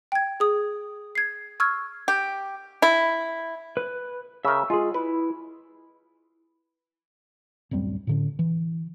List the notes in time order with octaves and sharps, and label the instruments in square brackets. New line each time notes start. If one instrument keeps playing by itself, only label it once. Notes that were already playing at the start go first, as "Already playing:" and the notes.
[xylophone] G5 G#6
G#4 D#6
G#6 C7
C#6 E6 F6 G#6
[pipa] G4
E4
[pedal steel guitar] B4
[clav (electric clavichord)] C#3 A#4 [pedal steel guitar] E5 E6
[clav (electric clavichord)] G#3 [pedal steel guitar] F4 G#4
[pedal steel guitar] E4 [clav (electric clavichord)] B4
[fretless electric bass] D1 F#2 G3 C4
A2 D3 C#4
E3